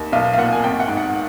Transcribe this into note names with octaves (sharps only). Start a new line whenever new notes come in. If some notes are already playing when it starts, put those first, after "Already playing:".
Already playing: D#2
B1 F5
F5
A#2 F#5
G#5
G#1 G5
F#5
G#2
F#5